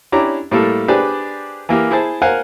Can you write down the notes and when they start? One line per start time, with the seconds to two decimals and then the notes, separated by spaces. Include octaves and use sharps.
0.12 C#4 D4 E4 G4 A#5
0.51 A2 G3 A#3 A4
0.88 D4 G4 G#4 B4 C5 D5
1.69 E3 A#3 G4 F6
1.91 E4 G#4 C5 A5
2.22 A#4 C5 F5 F#5 G#5